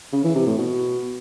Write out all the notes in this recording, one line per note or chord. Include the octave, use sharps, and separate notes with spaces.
C#3
E3
C3
A2
B2